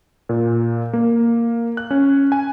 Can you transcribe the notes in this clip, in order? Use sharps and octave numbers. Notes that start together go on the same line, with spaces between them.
A#2
A#3
F#6
C#4
G#5